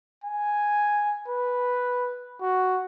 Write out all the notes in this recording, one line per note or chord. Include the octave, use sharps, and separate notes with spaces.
G#5
B4
F#4